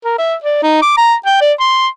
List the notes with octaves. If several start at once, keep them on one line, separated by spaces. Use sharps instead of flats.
A#4
E5
D5
D#4
D6
A#5
G5
D5
C6